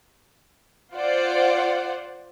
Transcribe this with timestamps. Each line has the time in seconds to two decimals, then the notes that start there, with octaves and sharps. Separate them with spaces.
0.94 F4 C5 D5 F#5